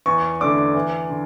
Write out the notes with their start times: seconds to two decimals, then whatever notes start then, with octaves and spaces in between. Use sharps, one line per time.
0.06 E2 C#6
0.41 D3 A3 D4 D6
0.75 E2
1.10 D3